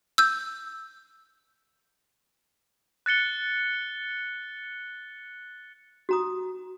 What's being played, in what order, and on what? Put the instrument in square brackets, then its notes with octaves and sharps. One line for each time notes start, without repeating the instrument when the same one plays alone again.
[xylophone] E6 G6
[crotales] F#6 A6 C#7 G7
[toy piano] F#4 A#5 D#6